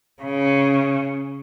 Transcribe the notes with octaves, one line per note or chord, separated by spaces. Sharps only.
C#3